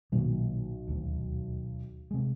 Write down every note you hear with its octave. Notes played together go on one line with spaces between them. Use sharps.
B1 A#2 D#3
D#1 D2
C3 G#3